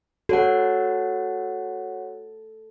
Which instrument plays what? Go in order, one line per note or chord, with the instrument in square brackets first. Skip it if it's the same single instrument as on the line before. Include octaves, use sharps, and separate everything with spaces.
[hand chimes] F#4 C#5 F#5 [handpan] A4